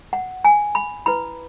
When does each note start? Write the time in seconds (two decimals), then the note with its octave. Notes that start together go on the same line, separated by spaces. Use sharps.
0.13 F#5
0.45 G#5
0.75 B5
1.06 E4 B4 B5